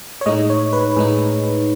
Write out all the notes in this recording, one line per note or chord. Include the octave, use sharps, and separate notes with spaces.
C#5
A2 G#3 D#4 D#5
C#5
B4
A2 G#3 D#4 G#4